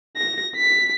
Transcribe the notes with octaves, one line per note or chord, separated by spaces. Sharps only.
A#6
B6